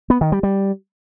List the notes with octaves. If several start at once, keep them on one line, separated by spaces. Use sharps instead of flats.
B3
D#3
G3
G3